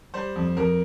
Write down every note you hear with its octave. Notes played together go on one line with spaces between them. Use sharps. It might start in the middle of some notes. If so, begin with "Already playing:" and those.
G3 C5
F2
F2 A#4